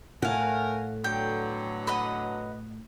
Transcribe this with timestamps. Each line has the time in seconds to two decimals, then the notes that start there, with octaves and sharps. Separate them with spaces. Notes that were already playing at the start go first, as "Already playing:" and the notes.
0.22 A2 A3 A#4 F5 F#5 G#5
1.04 B2 D3 F#3 G5
1.87 B4 D#5 F#5